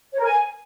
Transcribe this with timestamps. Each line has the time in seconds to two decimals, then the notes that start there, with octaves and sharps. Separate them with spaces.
0.13 C#5
0.19 A#4
0.24 G#5